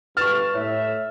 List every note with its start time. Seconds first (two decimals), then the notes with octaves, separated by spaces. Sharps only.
0.17 G1 G2 B4 C#6 F6 A6 E7
0.54 A2 C#5 E5